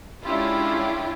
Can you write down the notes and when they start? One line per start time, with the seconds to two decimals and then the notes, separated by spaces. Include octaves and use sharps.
0.24 G#3 C#4 D4 E4 F4 G4